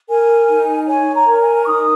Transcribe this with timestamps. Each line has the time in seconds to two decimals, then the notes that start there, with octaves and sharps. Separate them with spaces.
0.08 A#4 G#5
0.48 D#4
0.87 C#5 G#5
1.13 A#5
1.27 A#4
1.41 G#5
1.62 C#6
1.66 D#4 D#6